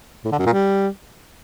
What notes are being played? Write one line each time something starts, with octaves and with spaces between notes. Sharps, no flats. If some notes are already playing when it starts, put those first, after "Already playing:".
A2
D3
F#2
A#2
G3